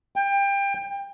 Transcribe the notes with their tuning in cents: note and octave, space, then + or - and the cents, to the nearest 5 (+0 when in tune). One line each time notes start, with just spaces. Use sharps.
G5 +25